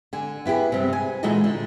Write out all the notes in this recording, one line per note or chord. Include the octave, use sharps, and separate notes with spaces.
D3 G#5
B3 E4 G4 G#4
G2 C3
G#5
A#2 E3 G#3 F#4 A4 D#5
D3